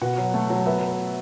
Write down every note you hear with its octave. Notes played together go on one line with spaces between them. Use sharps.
B2 F#5
F#3
A3
F#3
B3 E5